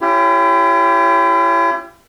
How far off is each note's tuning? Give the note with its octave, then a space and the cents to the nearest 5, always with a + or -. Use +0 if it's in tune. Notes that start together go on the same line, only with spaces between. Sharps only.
C#4 -5 E4 +40 G4 +0